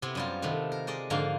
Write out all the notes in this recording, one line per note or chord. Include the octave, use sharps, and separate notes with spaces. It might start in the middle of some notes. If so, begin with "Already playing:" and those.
C3 B3 C4 E4
F#2 G3 F4
C3 D#3 A3 B3
A#4
G#3 D5 D#5
G#2 D3 F3 A#3 F5 C6